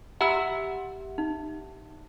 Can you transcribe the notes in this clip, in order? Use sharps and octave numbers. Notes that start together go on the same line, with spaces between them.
G4 E5 F#5 A#5 B5 E6
D#4